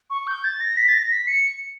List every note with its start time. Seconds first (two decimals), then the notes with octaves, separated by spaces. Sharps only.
0.10 C#6
0.27 G6
0.44 A6
0.60 A#6
0.77 B6
0.88 A6
0.94 A#6
1.11 B6
1.27 C#7